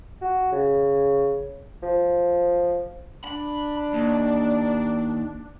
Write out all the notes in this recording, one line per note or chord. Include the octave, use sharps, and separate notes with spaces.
F#4
C#3
F3
D4 B5
D#2